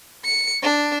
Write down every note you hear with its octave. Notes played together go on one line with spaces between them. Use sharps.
C#7
D4